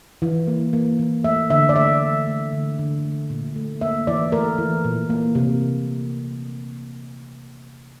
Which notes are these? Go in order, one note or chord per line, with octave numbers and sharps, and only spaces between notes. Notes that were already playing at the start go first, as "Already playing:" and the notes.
E3
A#3
A#3
E3
A3 E5
D3 E5
D5
A3 E5
E3
A3
D3
D3
A3
A#2
A3
A#3 E5
E3 D5
A3 A#4
E3
A#2
A#3
C3